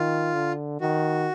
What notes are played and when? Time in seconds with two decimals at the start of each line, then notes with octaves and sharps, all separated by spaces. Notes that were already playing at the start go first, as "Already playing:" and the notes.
Already playing: D#3 F4
0.34 D3
0.81 D#3 F#4